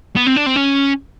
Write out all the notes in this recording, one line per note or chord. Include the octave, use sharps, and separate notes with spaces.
B3
C4
D4
C4
C#4